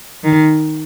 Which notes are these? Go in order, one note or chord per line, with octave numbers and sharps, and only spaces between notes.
D#3